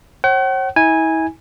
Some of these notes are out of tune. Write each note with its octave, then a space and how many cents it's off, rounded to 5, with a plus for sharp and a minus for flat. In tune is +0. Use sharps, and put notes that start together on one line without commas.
C#5 -45 F#5 +45
E4 -40 G#5 -10